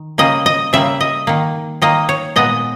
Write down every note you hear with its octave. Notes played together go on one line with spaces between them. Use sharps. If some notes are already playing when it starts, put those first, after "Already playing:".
Already playing: D#3
C#3 G3 A#3 D#5
D#5
C#3 G3 A#3 E5
D#5
D#3 A#3
D#3 A#3 D#5
C#5
A#2 G#3 B3 D#5